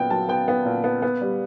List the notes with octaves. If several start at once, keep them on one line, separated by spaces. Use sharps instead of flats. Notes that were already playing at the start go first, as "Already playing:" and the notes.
Already playing: A#2 F#3 B3 G5
F#3 A5
B3 G5
B3
A#2
B3
B3
G3